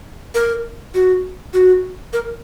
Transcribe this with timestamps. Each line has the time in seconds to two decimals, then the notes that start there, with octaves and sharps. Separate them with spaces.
0.34 A#4
0.94 F#4
1.54 F#4
2.13 A#4